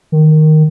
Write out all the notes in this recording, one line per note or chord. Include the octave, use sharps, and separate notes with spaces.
D#3